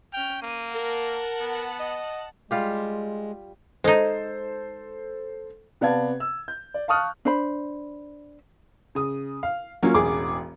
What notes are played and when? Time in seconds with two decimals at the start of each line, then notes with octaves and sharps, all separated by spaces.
0.13 C#4 G5 F6
0.42 A#3 D#7
0.75 A#4 F#5 A5
1.41 B3
1.80 D#5
2.51 G3 G#3 F4 G4
3.84 G#3 D#4 A4 C5
5.81 C3 B3 D5 F5 A5 G#6
6.20 E6
6.48 G6
6.74 D5
6.88 F5 A5 C#6 D#6 F6 F#6
7.25 D4 C5 B5
8.95 C#3 D#6
9.43 F5
9.83 F#3 A#3 C#4 F4
9.94 E1 A1 G#4 D6